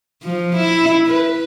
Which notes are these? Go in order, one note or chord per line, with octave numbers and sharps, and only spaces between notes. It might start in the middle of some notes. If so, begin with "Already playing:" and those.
F3
E4
B4